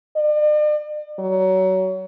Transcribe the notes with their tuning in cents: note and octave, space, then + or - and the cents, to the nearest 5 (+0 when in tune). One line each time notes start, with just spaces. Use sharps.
D5 +45
F#3 +25